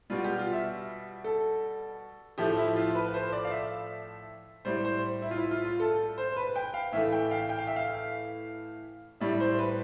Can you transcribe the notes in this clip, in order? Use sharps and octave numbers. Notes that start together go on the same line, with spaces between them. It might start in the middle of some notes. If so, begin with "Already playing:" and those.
B2 G3 F4
G4
F4
E5
A4
A2 F3 A3 G4
E4
F4
B4
B4
C5
D5
F5
E5
A2 G3 C5
C5
E4
F4
E4
F4
F4
A4
C5
B4
G5
F5
A2 E3 A3 E5
G5
F5
G5
F5
E5
F5
A2 G3 E5
C5
B4